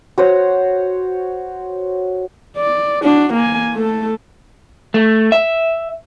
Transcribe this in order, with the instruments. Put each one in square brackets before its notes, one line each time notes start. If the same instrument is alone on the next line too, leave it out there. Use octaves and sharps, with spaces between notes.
[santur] F#4 C5 C#5
[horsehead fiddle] D5
D4 F#4
A#3 G#5
A3 A4
[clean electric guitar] A3
E5